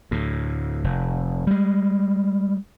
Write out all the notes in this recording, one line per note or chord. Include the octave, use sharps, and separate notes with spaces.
D2 A2
F1
G3 G#3